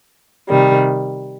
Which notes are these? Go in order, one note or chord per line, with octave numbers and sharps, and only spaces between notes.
C3 D#3 G3